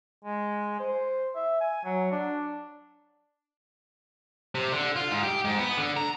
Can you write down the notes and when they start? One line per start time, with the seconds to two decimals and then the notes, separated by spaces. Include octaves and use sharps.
0.25 G#3
0.80 C5
1.35 E5
1.61 G#5
1.85 F#3
2.12 D4
4.55 C3
4.72 D3
4.96 F4
5.11 G#2
5.23 G4
5.45 G#2
5.58 B3
5.77 D3
5.97 A#5